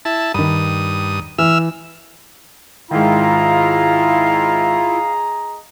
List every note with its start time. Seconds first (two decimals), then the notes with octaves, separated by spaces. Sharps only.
0.05 E4 A5
0.34 G2 D#3 B5 D#6
1.39 E3 E5 E6 F6
2.91 G#2 D#3 E4 F4 G#4 D#5 F5 A#5